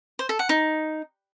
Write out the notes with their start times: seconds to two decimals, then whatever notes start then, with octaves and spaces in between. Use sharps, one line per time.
0.19 C5
0.29 A4
0.39 F#5
0.49 D#4